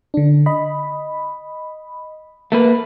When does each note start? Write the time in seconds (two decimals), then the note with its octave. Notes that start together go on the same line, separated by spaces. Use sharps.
0.14 D3 D4
0.46 D#5 B5
2.52 A3 A#3 B4